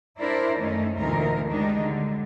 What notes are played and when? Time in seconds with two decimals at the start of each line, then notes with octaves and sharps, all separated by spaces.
0.19 D4 E4 A#4 C5 D5
0.60 F#2 D#3 A3 C#4 D#4
0.97 D2 A#2 D3 E3 D#4 A#4
1.50 D#3 G3 G#3 D4 D#4
1.81 D3